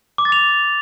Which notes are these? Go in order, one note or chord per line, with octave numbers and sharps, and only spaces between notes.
D6
A6
F7